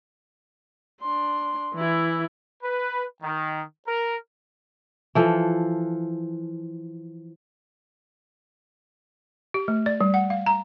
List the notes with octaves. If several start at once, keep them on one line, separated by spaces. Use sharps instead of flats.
D4 C6
E3 E4
B4
D#3
A#4
E3 F3 A4
G4
A3
D5
G3
F#5
F5
A#5